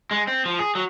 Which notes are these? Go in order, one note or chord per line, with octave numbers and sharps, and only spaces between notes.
G#3
C4
F3
G#4
F#3